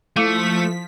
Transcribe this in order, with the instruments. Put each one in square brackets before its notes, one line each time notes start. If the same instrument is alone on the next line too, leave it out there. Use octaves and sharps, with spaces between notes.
[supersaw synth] F3 B6 [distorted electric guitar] A3 [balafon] E4 A4 F5